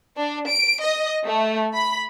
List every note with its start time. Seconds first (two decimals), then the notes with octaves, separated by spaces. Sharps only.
0.17 D4
0.49 D7
0.83 D#5
1.26 A3
1.74 B5